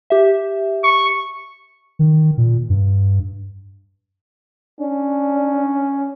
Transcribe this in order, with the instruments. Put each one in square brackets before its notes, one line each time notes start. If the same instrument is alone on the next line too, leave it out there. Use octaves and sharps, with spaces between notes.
[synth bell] G4 E5
[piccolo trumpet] C#6
[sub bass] D#3
A#2
G2
[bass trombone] C#4 [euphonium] D4